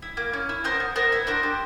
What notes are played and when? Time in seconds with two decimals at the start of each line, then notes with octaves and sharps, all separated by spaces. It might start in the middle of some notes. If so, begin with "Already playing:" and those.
0.02 E4
0.17 A#3
0.34 C#4
0.49 E4
0.64 B3 A#4 C5
0.80 B3
0.96 B3 A#4 C5
1.12 E4
1.27 D4 A#4 C5
1.43 G4